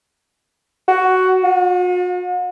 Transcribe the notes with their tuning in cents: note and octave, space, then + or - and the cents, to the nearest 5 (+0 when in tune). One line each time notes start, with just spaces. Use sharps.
F#4 +10
F#4 -45